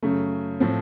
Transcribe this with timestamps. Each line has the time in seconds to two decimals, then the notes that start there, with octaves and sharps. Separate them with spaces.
0.03 F#2 C#3 A3
0.60 A2 F3 C4